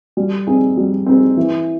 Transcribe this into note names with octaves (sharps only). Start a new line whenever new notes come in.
G3
C4 D#4 G#4
G3
C4 D#4 G#4
E3